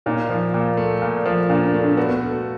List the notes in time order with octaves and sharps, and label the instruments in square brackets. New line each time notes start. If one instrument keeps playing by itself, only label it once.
[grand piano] A#2 [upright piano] D#4
[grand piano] F3
A#2
A3
A#2
F3
[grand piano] A#2 [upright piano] D4
[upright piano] D4
[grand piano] A3
[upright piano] D4
[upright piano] B3 [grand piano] F#4
[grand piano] A3